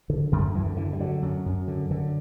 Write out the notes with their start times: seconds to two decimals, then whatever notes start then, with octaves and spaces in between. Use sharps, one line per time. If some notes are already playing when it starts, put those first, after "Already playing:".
0.10 D3
0.32 F#2 D3
0.54 F#2 E3
0.66 D3
0.77 D3 E3
0.93 G3
1.00 D3 F#3
1.23 F#2
1.46 F#2
1.68 D3
1.91 D3